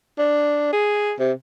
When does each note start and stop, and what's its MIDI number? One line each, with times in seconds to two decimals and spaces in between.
0.19 0.70 62
0.72 1.13 68
1.19 1.32 48